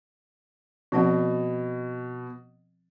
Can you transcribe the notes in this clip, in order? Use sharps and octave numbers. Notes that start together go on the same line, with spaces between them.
B2 F3 C4 F#5